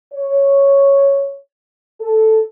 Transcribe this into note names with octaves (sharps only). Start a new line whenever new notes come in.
C#5
A4